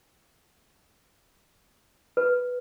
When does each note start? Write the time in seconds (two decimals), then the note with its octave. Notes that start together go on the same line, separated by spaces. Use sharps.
2.17 B4